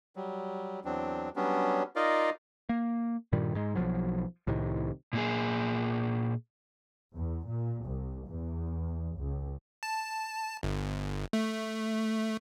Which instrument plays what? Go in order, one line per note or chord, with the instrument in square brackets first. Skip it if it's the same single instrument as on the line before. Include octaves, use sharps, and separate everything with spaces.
[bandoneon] F#3 G3
E2 F#3 C4 D4
F#3 G3 B3 C#4 D4
D#4 F4 A#4 D5 D#5 F5
[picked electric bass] A#3
G2 A#2 D#3 G3
G#2 G#3
B1 E2 F3 F#3
C2 A2 C3 D#3
[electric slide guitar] A#2 A#3 G#4
[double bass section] E2
A#2
C2
E2
C#2
[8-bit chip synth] A5
G1
A3